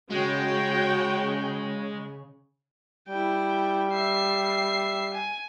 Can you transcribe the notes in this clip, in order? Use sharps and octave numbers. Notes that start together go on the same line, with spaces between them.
C#3 G#3 F#4 C#5 G5
G3 E4 G5
E5 C7
G#5